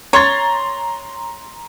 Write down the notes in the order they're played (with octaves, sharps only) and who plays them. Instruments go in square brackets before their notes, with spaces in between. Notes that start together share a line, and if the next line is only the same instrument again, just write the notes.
[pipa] C#5 [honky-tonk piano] A#5 C6 A6